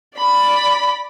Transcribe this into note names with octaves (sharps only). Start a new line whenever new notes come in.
D5 B5